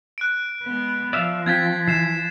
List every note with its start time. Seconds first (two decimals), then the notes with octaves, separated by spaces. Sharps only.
0.18 F#6 D7
0.63 G#3 B3
1.13 F3 D5 E5 F5
1.46 C4 F4 G5 G#6 A6 B6
1.87 E3 C7 E7